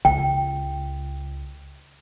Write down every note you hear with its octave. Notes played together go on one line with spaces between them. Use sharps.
C#2 G5